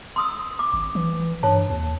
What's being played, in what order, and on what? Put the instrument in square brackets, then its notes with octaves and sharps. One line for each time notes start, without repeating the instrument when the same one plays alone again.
[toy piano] C6 D#6 E6
D6
[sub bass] G#1
E3
[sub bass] G2 [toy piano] C#5 A5
[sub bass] D#2